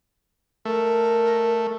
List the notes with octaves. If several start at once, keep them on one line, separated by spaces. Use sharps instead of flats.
A3 A#4